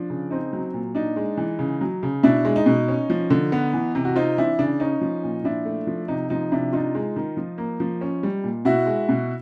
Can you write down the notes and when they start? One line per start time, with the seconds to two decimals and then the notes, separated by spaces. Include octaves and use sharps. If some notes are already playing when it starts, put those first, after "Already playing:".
Already playing: F3 D4
0.10 C#3
0.30 C4 D#4
0.53 F#3
0.73 A#2
0.95 D4 D#4
1.16 G#3
1.37 E3
1.59 C#3
1.81 F#3
2.03 C#3
2.23 B2 D4 E4
2.45 G#3
2.56 D#4
2.66 B2
2.88 C#4
3.10 F3
3.30 D3
3.52 B3
3.73 E3
3.95 C3
4.05 F#4
4.16 C4 D#4 F4
4.38 E3 D4 E4
4.59 C#3 D4
4.80 C#4 D#4
5.01 F3
5.24 A#2
5.44 F3 D4 E4
5.65 A3
5.87 F3
6.08 C3 D#4
6.30 F3 D#4
6.52 C3 D4 E4
6.72 D4 D#4 F4
6.95 G#3
7.16 D#3
7.37 F3
7.58 A#3
7.80 F3
8.01 C#4
8.23 G3
8.44 A#2
8.65 B2 E4 F#4
8.86 G#3
9.09 B2